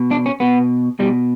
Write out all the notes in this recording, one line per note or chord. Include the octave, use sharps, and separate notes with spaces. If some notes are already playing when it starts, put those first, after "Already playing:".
Already playing: B2
D4
C#4
B2 B3
B2 G3